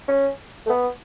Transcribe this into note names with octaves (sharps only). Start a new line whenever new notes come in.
C#4
A3
B3